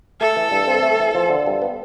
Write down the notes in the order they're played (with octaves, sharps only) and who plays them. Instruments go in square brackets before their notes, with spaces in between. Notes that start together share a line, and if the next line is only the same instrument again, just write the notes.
[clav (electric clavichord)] A3 [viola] A4
[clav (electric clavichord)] E3
G2
C4
A3
E3
F3
D3
G2
B3